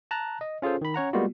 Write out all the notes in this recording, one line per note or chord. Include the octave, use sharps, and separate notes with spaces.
A5 A#5 F#6
D#5
C#4 F4 G#4 A4 C5
D#3 B5
C#4 C#5 F#5 A#5
G3 G#3 A#3 B3 F4 F#4